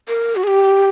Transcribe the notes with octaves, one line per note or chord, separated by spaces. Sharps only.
A#4
F#4
G#4
G4